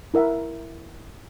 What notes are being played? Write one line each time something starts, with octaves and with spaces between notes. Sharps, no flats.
E4 A#4 E5 F#5